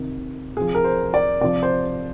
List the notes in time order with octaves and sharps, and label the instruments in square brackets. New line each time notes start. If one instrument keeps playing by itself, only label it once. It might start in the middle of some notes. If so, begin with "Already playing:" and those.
Already playing: [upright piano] C3 D#3
C3 F3 G#4
A#4
C5
D5
C3 F3 D5
C5